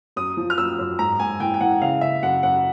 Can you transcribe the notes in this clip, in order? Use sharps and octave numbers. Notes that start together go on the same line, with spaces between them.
F#2 D#6
F3
F6
F#2 E6
F#2
G#2 A#5
G#2 G#5
E3 G5
G5
E3 F#5
C#3 F5
C#3 E5
F#2 F#5
F#2 F#5